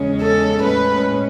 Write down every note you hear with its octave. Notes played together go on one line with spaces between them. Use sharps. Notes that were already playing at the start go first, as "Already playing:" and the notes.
Already playing: E2 C#3 G#3 C#4
A4
A2 G#3 C#4 B4